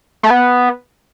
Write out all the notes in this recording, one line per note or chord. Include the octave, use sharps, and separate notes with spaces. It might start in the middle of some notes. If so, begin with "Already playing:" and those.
A3
B3